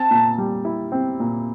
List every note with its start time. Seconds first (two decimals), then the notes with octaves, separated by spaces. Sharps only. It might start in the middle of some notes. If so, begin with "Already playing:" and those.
Already playing: C4 A5
0.11 A#2
0.38 G3
0.65 E4
0.92 C4
1.20 A#2